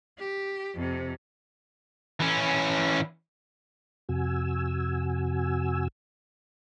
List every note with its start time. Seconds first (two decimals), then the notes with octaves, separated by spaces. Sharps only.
0.18 G4
0.75 F2 C3
2.20 E3 C#4
4.09 F2 C3 F#4 G#5 E6